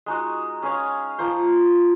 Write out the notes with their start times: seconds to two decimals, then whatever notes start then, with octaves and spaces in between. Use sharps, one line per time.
0.06 G#3 D#4 F#4
0.62 C#4 G#4 C#5 F5
1.19 F3 A#3 F4 C5